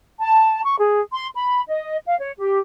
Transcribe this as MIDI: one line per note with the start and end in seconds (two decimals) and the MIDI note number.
0.20 0.61 81
0.64 0.76 85
0.79 1.00 68
1.13 1.27 84
1.35 1.61 83
1.68 1.97 75
2.07 2.18 77
2.20 2.32 73
2.38 2.58 67